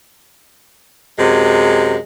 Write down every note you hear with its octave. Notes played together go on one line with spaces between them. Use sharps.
F#2 C3 G#3